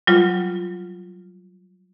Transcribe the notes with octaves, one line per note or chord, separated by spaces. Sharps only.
F#3 G3 F4